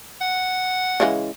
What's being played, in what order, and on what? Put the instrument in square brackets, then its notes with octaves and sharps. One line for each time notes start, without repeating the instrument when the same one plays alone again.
[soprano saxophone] F#5
[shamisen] C#3 E3 G#3